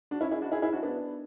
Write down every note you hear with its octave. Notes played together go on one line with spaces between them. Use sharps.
D4 F#4
C#4 E4
E4 G#4
D4 F#4
E4 G#4
E4 G#4
D4 F#4
B3 D4